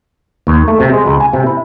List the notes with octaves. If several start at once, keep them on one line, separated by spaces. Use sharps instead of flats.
D#2
A3
C3
G#3
C#2
G#5
C3
E4